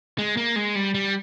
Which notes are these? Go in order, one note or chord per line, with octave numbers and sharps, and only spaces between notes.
G#3
A#3
G#3
G3
G3